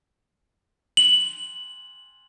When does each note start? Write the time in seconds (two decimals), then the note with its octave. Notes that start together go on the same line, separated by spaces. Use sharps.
0.97 F#7